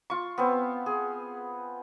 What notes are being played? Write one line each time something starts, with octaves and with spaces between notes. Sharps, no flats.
F4 C#6
B3 C4
G#4